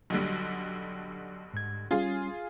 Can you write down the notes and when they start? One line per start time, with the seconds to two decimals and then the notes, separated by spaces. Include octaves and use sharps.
0.10 B1 D3 F#3 G3
1.54 G#2 G#6
1.91 G3 C#4 F4 G#4